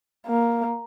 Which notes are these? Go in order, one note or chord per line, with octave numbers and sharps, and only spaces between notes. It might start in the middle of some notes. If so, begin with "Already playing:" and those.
A#3